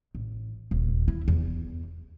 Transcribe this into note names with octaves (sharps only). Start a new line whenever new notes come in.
A1
D#1
E4
E2